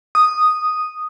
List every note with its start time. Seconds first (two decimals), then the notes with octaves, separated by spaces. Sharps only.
0.15 D#6